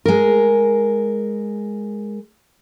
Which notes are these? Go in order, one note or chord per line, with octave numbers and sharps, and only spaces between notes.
G#3 A#4